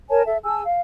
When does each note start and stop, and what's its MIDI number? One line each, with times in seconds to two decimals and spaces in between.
0.10 0.22 70
0.10 0.22 73
0.10 0.22 80
0.10 0.22 81
0.25 0.37 69
0.25 0.37 76
0.44 0.62 68
0.44 0.62 80
0.44 0.62 81
0.44 0.62 88
0.66 0.81 77